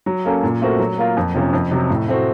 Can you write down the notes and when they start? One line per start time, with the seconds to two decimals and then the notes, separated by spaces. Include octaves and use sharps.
0.06 F#3
0.25 A#3 C#4 A4
0.43 A#2
0.62 A3 C4 F#4 A#4
0.79 F#3
0.98 A#3 F4 A#4
1.17 F2
1.35 C3 F3 A#3 C#4
1.53 F2
1.71 C3 F#3
1.90 A2
2.08 A3 C4 F#4